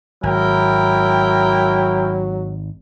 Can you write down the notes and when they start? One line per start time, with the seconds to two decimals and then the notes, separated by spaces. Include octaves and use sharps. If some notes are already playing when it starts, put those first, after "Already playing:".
0.23 G#1 F#3 E4 A#4 G5